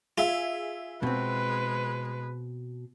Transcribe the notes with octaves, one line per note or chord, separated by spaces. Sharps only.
F4 G#4 E5
B2 G#3 C4 B4